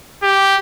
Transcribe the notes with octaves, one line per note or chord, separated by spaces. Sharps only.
G4